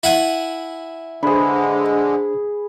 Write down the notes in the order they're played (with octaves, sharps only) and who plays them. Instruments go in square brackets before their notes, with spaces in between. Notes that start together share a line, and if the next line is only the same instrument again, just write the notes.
[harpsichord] E4 F#5 G#5
[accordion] D3 G#3 [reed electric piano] D4 C5 [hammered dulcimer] G#4 B4